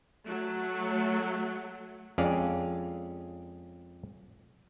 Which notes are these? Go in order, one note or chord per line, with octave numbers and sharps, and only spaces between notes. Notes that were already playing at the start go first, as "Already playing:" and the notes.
F#3 A3
F2 G#3 C#4 G#4 D5 F5